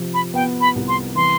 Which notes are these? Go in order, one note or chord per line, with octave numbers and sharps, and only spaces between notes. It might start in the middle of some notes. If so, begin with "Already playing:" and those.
Already playing: C3 F3
B5
B3 G5
B5
C2
C6
E3 C6